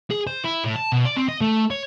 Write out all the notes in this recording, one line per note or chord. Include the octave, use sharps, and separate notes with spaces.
G#4
C5
E4
A2
A5
B2
D5
C4
D#5
A3
C#5